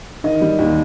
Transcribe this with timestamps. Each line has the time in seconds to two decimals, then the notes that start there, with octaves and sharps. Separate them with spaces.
0.24 D#3 D#5
0.41 G3
0.59 D#2